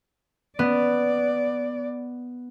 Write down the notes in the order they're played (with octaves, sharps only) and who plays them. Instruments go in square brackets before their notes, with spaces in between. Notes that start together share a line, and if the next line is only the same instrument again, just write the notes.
[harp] B3 [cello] D5